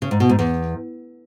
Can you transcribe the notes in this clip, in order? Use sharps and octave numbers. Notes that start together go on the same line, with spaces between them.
C#3
G#2
B2
G#2
E2